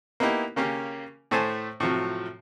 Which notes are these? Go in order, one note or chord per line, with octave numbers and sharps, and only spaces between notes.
A#3 B3 D#4 E4 G4
C#3 A#3 C#4 G4
A2 A3 C5 G#5 A5
A2 C3 F3 F#3